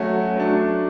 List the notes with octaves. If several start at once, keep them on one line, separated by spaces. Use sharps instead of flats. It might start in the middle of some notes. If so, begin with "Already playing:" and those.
Already playing: F#3 A3 C#4 F#4
F#3 A3 D4